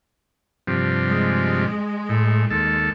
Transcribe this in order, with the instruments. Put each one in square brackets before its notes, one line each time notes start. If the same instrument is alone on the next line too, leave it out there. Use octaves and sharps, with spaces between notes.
[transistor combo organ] G2 C3 F3
[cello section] G#3
[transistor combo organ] A2
D#2 A4